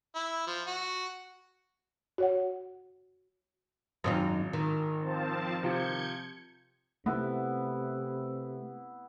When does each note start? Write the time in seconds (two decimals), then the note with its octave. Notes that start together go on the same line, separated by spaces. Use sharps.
0.15 E4
0.47 F3
0.67 F#4
2.18 F#4 C#5 F#5
4.04 G#1 F#2 C4 D#4 F4
4.53 D#3
5.01 F3 C4 A5
5.63 C3 F3 G6 G#6 C#7
7.06 C3 A3 B3 E4